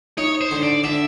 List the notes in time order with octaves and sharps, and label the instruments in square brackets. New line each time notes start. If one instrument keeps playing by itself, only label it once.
[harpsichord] D#4 [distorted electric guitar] C#5
[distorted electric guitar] C5
[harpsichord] D3
[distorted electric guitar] D5
[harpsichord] D3 [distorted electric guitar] E5